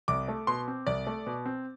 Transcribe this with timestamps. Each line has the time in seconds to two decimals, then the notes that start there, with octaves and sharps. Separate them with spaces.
0.08 C2 D6
0.28 A3
0.47 B2 C6
0.68 C4
0.87 C2 D5
1.07 A3
1.26 B2
1.46 C4